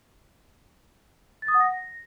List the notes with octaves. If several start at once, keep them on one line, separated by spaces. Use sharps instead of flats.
A6
D#6
F#5
A#6